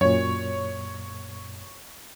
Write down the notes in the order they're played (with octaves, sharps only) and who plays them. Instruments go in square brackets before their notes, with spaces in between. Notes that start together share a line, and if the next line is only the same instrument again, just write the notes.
[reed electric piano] F#2 A#2 [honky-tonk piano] C#5